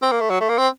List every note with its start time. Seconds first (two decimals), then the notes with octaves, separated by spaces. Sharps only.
0.02 C4
0.12 A#3
0.21 A3
0.30 F#3
0.40 A3
0.49 A#3
0.58 C4